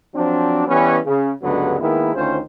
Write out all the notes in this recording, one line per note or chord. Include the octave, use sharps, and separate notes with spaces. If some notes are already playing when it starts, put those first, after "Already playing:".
F3 F#3 C4 D4
E3 G3 B3 C#4
C#3
C#2 G2 D3 F#3 G#3 B3
D#3 G#3 A#3 B3 E4
D2 D#3 C#4 F4 C5